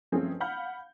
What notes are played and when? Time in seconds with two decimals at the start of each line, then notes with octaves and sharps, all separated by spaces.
0.12 G1 F3 A3 C4 C#4 G#4
0.40 F5 F#5 B5 F6 G6